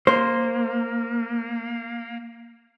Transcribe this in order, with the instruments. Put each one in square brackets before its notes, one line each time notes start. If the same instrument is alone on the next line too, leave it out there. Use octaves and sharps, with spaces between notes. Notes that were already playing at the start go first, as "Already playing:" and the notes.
[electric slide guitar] A#3 [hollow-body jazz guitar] C5